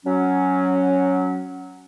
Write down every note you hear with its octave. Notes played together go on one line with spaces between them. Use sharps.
F#3 C#4